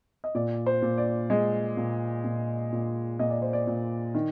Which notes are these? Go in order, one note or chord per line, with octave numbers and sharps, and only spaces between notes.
D#5
A#2 D5
C5
A#2
D5
G#3
A#2
A#2
A#2
A#2 D#5
D5
C5
D5
A#2
D#3